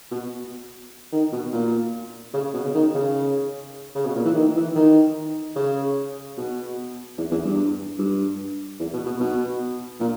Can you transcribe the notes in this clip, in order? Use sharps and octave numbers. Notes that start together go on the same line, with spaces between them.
B2
D#3
B2
A#2
C#3
B2
C#3
D#3
C#3
C#3
B2
A#2
E3
D#3
E3
D#3
C#3
B2
E2
E2
G2
G2
E2
B2
B2
B2
A#2